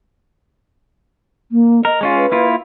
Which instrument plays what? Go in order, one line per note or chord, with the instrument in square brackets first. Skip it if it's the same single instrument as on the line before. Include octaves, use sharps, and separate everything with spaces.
[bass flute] A#3
[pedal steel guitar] A#4 [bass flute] D#5
[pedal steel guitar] G#3 C#4 F4
[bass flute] B4
[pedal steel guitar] A#3 E4 F4